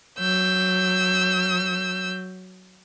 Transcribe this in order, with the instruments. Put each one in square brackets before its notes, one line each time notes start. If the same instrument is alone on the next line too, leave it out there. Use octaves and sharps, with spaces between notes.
[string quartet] F#3 E6 G6